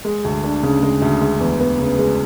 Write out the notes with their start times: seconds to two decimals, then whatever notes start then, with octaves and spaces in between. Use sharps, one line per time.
0.05 G#3
0.25 D2
0.43 D4
0.63 C#3
0.82 G#3
1.02 D2
1.21 G#3
1.40 E2
1.60 B3
1.79 C#3
1.99 G#3